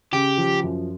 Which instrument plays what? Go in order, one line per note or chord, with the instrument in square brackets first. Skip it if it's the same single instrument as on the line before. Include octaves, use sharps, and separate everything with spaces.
[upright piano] C#3 [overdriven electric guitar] G4
[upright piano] F3
F#2